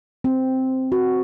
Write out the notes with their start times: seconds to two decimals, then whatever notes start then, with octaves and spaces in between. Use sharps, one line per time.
0.24 C4
0.92 F#4